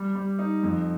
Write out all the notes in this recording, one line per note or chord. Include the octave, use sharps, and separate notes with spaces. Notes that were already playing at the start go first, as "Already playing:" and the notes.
Already playing: G3
G3
D#4
F2